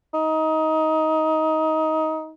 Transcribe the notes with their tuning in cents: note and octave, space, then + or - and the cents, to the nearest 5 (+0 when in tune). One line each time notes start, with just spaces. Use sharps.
D#4 +20